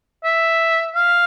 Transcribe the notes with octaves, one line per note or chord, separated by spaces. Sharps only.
E5
F5